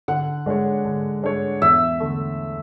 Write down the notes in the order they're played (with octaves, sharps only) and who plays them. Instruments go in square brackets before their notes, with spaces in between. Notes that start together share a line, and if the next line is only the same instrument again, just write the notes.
[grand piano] D3 [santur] F#5
[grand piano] G#3 D4 A4 C#5
D3
G#3 D4 A4 C#5
[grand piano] E2 [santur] E5
[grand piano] D3 A3